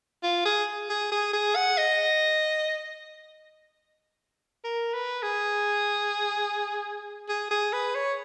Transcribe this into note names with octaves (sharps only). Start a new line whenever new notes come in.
F4
G#4
G#4
G#4
G#4
F#5
D#5
A#4
B4
G#4
G#4
G#4
B4
C#5